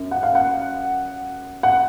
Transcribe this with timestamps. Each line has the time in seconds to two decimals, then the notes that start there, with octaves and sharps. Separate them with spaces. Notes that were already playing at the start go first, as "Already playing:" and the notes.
Already playing: F#2
0.11 F#5
0.23 F5
0.35 F#5
1.63 F#5